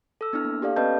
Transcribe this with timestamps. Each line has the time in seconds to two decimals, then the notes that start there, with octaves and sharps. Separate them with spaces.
0.21 A4 E6
0.33 B3 D4 E4 F6
0.45 A#3
0.62 G4 A4 D5 F5
0.76 B3 C#4 B4 D#5 A5 G6